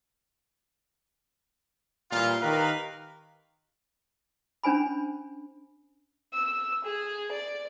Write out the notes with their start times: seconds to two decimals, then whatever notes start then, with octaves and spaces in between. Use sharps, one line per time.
2.11 A#2 E3 G3 F4
2.41 D#3 G4 A#4 B4 F5
4.63 C#4 D4 C5 G#5 B5
6.33 E6
6.84 G#4
7.31 D5